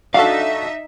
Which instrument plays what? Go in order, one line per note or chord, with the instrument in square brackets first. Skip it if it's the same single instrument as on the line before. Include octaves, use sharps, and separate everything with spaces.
[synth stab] D4 F#4 A4 [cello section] D#4 E5 [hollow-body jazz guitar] F5